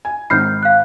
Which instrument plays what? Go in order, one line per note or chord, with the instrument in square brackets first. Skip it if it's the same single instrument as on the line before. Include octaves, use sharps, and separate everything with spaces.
[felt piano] G#5
[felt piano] G#1 D#3 C7 [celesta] B5 F6 G6
[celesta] F5 F#6